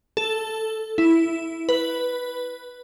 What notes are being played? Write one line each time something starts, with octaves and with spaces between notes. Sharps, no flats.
A4
E4
B4